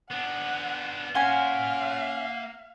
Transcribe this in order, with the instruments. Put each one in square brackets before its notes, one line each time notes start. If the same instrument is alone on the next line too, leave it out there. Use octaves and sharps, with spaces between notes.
[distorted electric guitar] B3 D4 [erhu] F#5
[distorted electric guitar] A#3 C6 [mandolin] C#4 G#5 [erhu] F5 [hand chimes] F#5